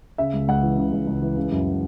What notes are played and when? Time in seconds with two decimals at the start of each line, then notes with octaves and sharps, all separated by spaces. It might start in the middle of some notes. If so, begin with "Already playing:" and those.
0.18 C#3 E5
0.33 C#2
0.48 C#2 F#5
0.63 E3
0.77 C#3
0.92 C#2
1.07 C#2
1.22 E3
1.37 C#3
1.52 F#2